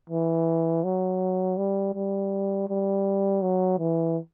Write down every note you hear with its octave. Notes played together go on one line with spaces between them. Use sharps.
E3
F#3
G3
G3
G3
F#3
E3